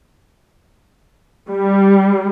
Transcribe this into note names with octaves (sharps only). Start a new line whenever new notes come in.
G3